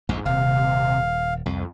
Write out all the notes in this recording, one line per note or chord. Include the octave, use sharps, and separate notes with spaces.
A#1 F2 G#2
D#1 C3 F5
C2 F2